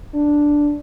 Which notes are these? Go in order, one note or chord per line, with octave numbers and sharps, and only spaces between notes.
D4